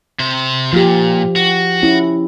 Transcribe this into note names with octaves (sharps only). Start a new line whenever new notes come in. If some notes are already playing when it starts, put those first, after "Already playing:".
C3 C5
A#2 F3 G4
F#4
C#4 E4